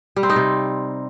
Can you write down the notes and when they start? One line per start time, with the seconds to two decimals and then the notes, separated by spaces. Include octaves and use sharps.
0.16 G3
0.23 C4
0.30 D#4
0.36 C3